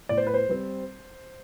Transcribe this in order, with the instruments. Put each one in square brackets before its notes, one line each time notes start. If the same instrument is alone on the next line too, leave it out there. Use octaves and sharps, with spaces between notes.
[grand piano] A2 D5
C5
B4
C5
G3 C4